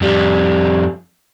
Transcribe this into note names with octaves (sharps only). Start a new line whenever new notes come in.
F2 G3